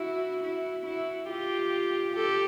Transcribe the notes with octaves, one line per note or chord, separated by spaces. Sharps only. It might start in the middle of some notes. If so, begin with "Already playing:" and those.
Already playing: E4 F#4
E4 F#4
E4 F#4
F4 G4
G4 A4